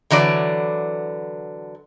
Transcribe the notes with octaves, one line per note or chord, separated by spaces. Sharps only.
D3 E3 F#3 D5